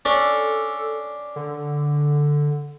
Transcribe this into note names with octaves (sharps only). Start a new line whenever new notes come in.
C#4 D4 A4
D3